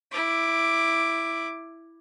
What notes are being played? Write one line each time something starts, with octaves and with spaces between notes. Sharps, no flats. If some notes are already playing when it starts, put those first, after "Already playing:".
E4 D6